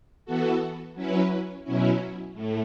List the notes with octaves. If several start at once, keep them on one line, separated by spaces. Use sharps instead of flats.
E3 B3 F#4 A4
F#3 C#4 E4 B4
B2 F#3 C#4 E4
A2 A3